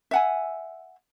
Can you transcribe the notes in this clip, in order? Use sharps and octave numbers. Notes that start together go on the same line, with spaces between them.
E5 F#5 G#5